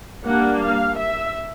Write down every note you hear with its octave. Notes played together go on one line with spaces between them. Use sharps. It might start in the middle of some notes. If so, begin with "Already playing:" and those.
G3 A#3 D4 F#5
F5
E5